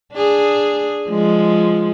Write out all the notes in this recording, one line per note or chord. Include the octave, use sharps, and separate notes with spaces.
D4 G#4
F3 G#3